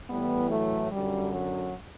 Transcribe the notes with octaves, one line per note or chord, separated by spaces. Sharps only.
A2 E3 G3 B3
F#3 A3
F#2 D3 G3
F#3